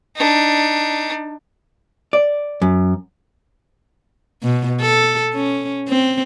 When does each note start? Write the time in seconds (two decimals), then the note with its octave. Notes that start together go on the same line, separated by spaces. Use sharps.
0.16 D4 D#4
2.13 D5
2.62 F#2
4.43 B2
4.81 A4
5.34 C#4
5.89 C4